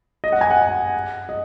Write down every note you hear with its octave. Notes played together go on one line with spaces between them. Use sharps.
D#5
F#5
G#5
F#5
D#5